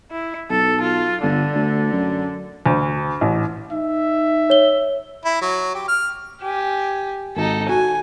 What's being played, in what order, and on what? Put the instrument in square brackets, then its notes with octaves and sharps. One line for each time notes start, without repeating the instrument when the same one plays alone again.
[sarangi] E4
[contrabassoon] B1 [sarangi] A4
[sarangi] F4
[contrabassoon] G1 [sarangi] D3
[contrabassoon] D2
F#2
[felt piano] D2
A1
[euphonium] D#4 [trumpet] E5
[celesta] C#5 G7
[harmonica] E4
F#3
G4
F6
[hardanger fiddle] G4 G#5
[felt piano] G#1 [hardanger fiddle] D#4 A4
[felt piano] F#4 [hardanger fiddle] G#5